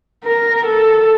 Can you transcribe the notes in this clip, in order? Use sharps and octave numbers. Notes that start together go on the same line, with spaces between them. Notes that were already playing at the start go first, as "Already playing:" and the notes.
A#4
A4